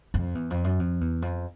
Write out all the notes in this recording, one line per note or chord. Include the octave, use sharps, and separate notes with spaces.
F2
E2
F2
F#2
F2
E2
F2